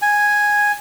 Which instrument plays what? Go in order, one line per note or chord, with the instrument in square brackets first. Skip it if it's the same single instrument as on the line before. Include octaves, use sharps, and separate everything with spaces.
[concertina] G#5